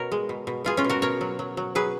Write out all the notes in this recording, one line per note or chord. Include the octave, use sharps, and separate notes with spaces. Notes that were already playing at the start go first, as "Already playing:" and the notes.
Already playing: B2 A#4 C#5
G#3
B2
B2
B2 F4 G#4
C#4 F4
B2
F#4 A#4
B2 A#4 C#5
F#3
F#3
F#3
F#3 G#4 B4